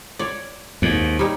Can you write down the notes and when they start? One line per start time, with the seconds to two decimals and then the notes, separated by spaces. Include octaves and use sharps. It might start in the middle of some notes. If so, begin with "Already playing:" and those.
0.19 C#5 D5
0.82 D#2 G#2
1.19 G3 D#4 C#5